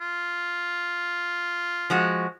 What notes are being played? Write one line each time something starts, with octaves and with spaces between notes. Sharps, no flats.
F4
F3 G#3 F#4